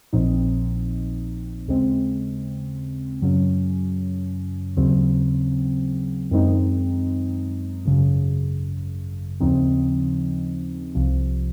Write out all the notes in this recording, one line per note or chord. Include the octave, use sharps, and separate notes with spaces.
A#1 A#2 F3 C4 D#4
D#2 C#3 G#3 C4
F#2 C#3 F#3 C#4
D#2 C#3 F#3 C4
F#2 D#3 G#3 C4 D#4
G#1 F#2 C#3
D#2 C#3 F3 C4 D#4
C2 C3 F3